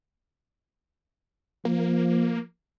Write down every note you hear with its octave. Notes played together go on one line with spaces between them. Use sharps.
F3 A#3